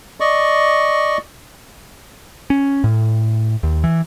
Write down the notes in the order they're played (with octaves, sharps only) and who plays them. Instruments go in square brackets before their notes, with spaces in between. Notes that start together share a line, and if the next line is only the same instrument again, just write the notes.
[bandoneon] D5 D#5 C#6
[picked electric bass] C#4
A2
D#2
E3